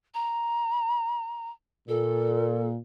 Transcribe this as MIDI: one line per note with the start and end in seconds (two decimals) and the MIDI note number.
0.14 1.50 82
1.88 2.77 46
1.88 2.67 69